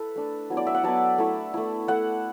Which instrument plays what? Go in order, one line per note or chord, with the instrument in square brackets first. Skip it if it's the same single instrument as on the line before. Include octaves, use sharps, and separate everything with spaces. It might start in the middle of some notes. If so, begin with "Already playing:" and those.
Already playing: [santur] E4 A4 B4
A3 D4
F#3 B3 E4
D5
E5
F#5
F#3 B3 E4 A5
A3 E4
A3 E4
A3 E4 F#5